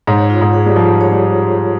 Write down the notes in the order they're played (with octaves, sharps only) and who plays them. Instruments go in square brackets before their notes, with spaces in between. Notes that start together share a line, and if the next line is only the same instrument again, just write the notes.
[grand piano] G#2 [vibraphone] C#5
[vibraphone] F4
[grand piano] G#2
[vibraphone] G#4
[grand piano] G3
[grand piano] F3 [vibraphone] F4
[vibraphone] C#5
[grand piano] G3